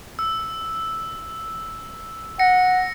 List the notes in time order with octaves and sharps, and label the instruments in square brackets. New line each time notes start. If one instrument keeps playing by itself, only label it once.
[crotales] E6
[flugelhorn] F#5 [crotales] A#6 C#7